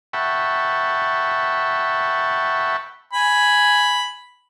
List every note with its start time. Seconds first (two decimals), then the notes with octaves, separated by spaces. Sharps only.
0.13 E5 F#5 G5 A5 B5 C#6
3.13 G#5 B5